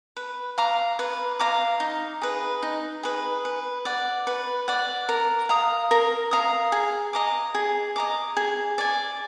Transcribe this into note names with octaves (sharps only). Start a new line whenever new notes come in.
B4
F5 A#5 D6
B4
F5 A#5 D6
D#4
G#4 B4
D#4
G#4 B4
B4
D5 F#5
B4
D5 F#5
A#4
F5 A#5 D#6
A#4
F5 A#5 D#6
G#4
D#5 A#5 D6
G#4
D#5 A#5 D6
G#4
D5 G#5